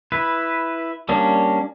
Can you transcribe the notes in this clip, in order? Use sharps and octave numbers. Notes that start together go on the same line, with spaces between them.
E4 B4
G3 A#3 C#4 D4